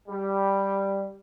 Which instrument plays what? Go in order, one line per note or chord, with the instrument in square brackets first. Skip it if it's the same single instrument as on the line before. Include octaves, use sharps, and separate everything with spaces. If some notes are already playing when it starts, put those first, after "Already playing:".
[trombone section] G3